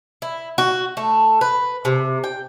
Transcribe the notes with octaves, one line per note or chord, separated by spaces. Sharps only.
E4
F#4
A3
B4
C3
G5